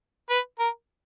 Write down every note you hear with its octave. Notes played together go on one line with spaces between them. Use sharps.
B4
A#4